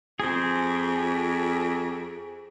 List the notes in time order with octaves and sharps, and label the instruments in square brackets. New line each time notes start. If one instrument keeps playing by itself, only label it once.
[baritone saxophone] F2 [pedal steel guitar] G#4 C5